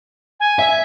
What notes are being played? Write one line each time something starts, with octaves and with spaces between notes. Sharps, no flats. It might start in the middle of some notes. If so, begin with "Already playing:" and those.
G#5
E5